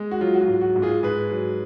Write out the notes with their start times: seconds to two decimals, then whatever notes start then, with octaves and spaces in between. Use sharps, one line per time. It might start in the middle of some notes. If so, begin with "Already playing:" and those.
Already playing: G#3
0.11 F#4
0.21 F#3 F4
0.34 F#4
0.41 F4
0.48 G#2
0.61 F#4
0.76 G#2
0.82 F4 G#4
1.03 G#2 G#4 B4
1.31 F#3